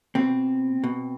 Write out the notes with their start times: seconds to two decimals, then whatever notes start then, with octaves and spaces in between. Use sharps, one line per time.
0.15 B2 C4
0.84 B2